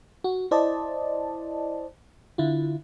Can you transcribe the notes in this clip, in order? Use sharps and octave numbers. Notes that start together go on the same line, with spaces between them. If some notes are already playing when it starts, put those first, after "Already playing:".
F#4
E4 C5 D5 D#5 A5
D3 E4 F4